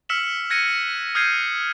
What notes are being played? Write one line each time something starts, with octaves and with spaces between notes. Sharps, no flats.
E6 F6 B6 C#7 E7 F#7
F#6 G#6 A#6 C#7 D#7
D#6 F6 G6 G#6 C7 D#7